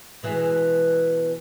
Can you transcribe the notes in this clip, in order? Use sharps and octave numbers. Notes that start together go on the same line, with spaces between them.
B2 E3 G#3